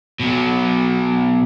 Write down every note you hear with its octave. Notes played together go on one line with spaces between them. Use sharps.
B2 F#3